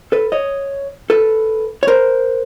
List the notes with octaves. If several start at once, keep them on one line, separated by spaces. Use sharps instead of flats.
A4 B4
C#5 D#5
A4 B4
C#5
A#4 C5